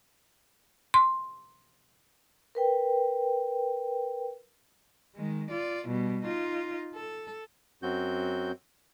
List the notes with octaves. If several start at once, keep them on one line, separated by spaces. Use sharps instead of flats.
C6
A#4 B4 G5
D#3 G#3
F4 D5
B2 G3
D#4 F4
A4
F#2 F#3 C4 F#4 G6